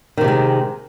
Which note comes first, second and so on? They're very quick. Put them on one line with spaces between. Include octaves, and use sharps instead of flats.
D#3 C3 A3 G#3